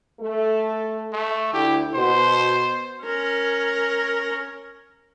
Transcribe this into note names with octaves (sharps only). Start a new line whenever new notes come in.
A3 A4
A3
D2 D3 E4 G4
B2 C5
C#4 A#4